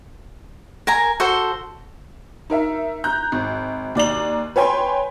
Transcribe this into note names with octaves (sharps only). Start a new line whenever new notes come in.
A#4 G#5 A#5
F#4 A4 C5
D#4 A#4 E5
A#5 F#6 G6
G#1
D#2 D5 A#5 F#7
B4 C#5 G5 G#5 B5 C6